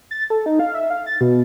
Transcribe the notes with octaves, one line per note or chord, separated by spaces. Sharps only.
A6
A4
D#4
F5
E5
F5
A6
B2